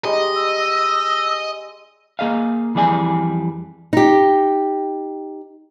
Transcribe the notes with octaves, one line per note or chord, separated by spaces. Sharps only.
G3 G#3 D#4 D#5
E6
E6
A#3 G#4 D#5 F5
F2 E3 G3 G#4 D5 G#5
D#4 G4